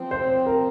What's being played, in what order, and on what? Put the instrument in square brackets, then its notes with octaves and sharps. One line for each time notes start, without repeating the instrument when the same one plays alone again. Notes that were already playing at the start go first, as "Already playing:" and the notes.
Already playing: [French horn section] F3 C4
[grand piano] C5
A#4